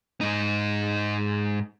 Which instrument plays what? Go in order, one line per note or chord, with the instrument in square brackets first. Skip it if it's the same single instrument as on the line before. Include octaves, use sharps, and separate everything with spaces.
[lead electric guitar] G#2 D#4